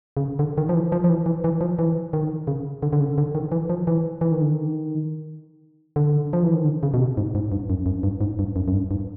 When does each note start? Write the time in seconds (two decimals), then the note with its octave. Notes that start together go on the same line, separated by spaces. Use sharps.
0.17 C#3
0.39 D3
0.58 D#3
0.69 F3
0.74 E3
0.92 F3
1.04 F3
1.09 E3
1.26 E3
1.44 E3
1.61 F3
1.79 E3
2.13 D#3
2.47 C#3
2.83 D3
2.93 D3
3.00 C#3
3.18 D3
3.35 D#3
3.52 E3
3.70 F3
3.87 E3
4.21 E3
4.32 D#3
4.41 D3
4.52 D#3
5.96 D3
6.33 F3
6.43 E3
6.54 D#3
6.64 D3
6.83 C#3
6.94 B2
7.00 C3
7.17 G#2
7.35 G#2
7.52 G2
7.70 F#2
7.86 F#2
8.03 G2
8.21 G#2
8.39 G2
8.56 F#2
8.68 F#2
8.74 G2
8.91 G2